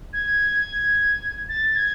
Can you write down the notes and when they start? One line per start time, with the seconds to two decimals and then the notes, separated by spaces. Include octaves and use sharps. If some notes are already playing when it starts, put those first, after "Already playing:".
0.13 G#6
1.49 A6
1.76 G#6